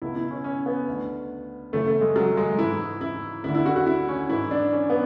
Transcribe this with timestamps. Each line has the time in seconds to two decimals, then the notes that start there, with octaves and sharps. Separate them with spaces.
0.02 C#2 B2 E4
0.16 E4
0.31 C#4
0.44 C#4
0.66 B3
0.88 D2 D3
1.73 F#2 C#3 E3 A3
1.87 A3
2.01 G#3
2.16 F#3
2.37 G#3
2.58 G#2 E3 E4
3.01 E4
3.44 D2 D3 E4
3.55 E4
3.66 F#4
3.76 F#4
3.87 E4
4.08 C#4
4.29 G#2 E3 E4
4.51 D4
4.72 C#4
4.90 B3